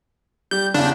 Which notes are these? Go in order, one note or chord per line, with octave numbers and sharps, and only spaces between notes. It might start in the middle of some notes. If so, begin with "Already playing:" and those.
G3 G4 G6
E2 C#3 D4